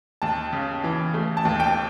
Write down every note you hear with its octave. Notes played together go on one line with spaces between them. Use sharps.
D#2 A5
C#3
E3
A3
A5
D#2
G5